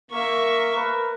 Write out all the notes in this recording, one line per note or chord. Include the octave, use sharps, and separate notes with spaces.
A#3 A#4 E5 C#6
A#4 B4